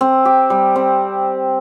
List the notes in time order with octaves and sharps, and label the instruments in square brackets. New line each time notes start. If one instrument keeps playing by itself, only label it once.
[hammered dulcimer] C4
G4
G3
C4